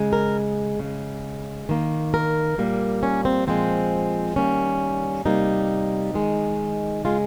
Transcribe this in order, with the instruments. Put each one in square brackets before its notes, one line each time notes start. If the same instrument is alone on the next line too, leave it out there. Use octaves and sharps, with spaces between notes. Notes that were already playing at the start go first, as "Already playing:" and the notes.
Already playing: [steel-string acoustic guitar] C#3 G#3
A#4
C#3 G#3
D#3 A#3
A#4
A#2 G3 A#3
C#4
C4
A#2 F3 G#3 C4
D#3 G3 A#3 C#4
C3 G3 A#3 D#4
D#3 G#3
C#3 G#3 F4